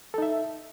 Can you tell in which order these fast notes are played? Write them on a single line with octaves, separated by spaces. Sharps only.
A4 D#4 E5